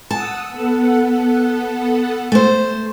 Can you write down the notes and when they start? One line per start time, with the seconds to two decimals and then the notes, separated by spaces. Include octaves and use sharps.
0.11 F#5 A5 D#6 E6
0.49 B3 A4 F#5
2.32 A3 C5